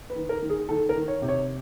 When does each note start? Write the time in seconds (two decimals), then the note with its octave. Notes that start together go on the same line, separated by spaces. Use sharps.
0.10 B4
0.16 D#3
0.29 A#4
0.42 D#3
0.50 G#4
0.69 D#3 A4
0.89 A#4
0.96 D#3
1.08 C#5
1.22 C3
1.28 C#5